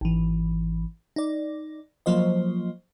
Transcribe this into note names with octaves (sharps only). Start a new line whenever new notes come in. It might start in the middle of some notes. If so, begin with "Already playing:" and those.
G#1 E3
D#4 D5
F3 F#3 A#3 F4 C5 D#5